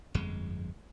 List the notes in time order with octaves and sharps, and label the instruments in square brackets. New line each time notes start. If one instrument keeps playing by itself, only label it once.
[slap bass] G1 F2 G#3